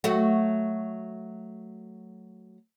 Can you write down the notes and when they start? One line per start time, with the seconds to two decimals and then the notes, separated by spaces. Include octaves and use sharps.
0.04 F#3 A3 F#4